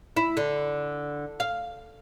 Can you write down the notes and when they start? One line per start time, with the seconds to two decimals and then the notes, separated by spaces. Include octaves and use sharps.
0.16 E4
0.37 D3
1.40 F5